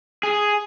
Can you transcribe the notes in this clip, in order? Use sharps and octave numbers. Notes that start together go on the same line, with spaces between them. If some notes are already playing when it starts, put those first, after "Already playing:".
G#4